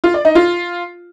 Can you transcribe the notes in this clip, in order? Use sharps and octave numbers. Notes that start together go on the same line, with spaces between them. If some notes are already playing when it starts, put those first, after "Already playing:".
F4
D5
D#4
F4